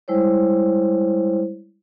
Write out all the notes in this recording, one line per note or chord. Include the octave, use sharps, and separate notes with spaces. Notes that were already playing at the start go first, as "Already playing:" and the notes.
G3 G#3 E4 C5 C#5